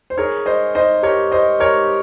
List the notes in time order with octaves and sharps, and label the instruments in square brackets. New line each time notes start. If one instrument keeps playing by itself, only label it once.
[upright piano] C5
[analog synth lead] G#4 [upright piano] A#4 C#5
[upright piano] C5 D#5
C5 D#5
[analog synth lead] G4 [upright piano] A#4 C#5
[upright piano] C5 D#5
A#4 C#5